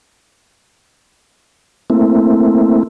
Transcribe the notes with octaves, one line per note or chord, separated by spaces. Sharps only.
A3 A#3 C4 E4